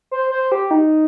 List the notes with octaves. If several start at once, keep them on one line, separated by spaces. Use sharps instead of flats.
C5
C5
G4
D#4